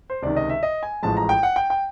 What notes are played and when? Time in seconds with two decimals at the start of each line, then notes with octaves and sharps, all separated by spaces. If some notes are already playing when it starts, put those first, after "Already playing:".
0.10 C5
0.22 C#2 C3 D#3 D5
0.37 D#5
0.49 E5
0.63 D#5
0.83 G#5
1.03 A1 A2 F3 G#3 A5
1.17 A#5
1.29 G5
1.43 F#5
1.56 G5
1.70 G5